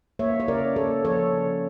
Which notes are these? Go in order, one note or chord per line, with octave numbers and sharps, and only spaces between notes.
A#3 C#5 E5
C#5
C#3 A#4 D5
A#3 A4 C#5
F3 A4 C#5
C#3